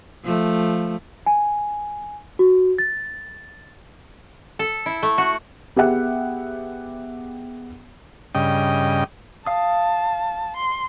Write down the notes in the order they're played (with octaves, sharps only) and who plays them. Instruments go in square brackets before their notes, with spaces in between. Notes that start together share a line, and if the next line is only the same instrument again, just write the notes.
[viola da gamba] F3 A3
[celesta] G#5
F#4
A6
[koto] A4
E4
A3
F#4
[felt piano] B3 G4 G#4 E5 F#5
[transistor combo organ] G2 C#3 D#5 G5
[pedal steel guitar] F5 D#6 [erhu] A5
[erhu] C6